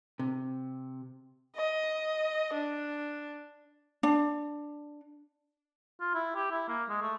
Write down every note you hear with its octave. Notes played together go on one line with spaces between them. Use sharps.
C3
D#5
D4
D4
F4
E4
G4
E4
A#3
G#3
A3